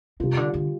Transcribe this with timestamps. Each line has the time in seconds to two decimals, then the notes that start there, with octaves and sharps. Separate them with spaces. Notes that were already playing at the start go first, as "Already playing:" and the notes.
0.20 C3 G3 F4
0.37 D3
0.54 D3